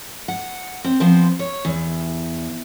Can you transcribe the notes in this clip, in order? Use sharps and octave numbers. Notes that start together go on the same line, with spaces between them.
F#5
C4
F3 B3 C4 C5
C#5
E2